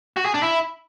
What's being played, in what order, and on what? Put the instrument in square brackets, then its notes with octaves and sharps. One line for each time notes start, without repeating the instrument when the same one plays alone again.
[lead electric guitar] F#4
G#4
D4
E4